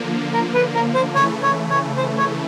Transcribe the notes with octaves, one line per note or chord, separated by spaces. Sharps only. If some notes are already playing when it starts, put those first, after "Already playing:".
Already playing: D3 F3 A#3
A#4
B4
A#4
C5
C#3 E3 A3 C#5
C#5
C#5
C5
C#5